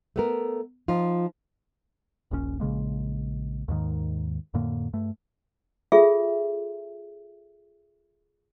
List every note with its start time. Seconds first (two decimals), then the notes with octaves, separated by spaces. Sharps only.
0.16 A3 B3 A#4
0.88 F3 D#4 F4
2.31 D#1 A#1 G#2 C#4
2.60 A#1 C#3 G#3 A#3
3.68 D#2 G#2 D#3
4.54 F2 A2 D3 A#3
4.93 G2 A3
5.92 F4 G#4 A4 E5